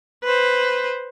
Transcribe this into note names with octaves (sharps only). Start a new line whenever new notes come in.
B4 C5